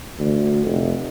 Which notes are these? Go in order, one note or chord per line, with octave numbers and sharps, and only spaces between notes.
D2
F1